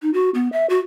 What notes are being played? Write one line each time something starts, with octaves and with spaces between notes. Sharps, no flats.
D#4
F#4
B3
E5
F#4